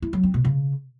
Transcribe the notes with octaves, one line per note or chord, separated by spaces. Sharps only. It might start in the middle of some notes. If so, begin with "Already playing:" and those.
E4
F#3
C4
B2
C#3